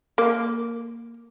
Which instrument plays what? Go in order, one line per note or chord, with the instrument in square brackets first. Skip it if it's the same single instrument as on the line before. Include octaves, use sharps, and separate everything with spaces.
[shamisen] A#3